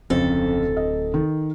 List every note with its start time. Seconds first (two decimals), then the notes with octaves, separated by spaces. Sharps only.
0.10 D1 F2 C#3 C4 A4
0.77 D#5
1.14 D#3